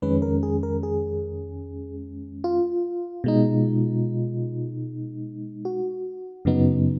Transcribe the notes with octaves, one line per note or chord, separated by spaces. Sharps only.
F2 D#3 G#3 C#4 B4
A#4
G#4
A#4
G#4
F4
B2 G#3 D#4
F#4
F#2 C#3 F#3 B3 D#4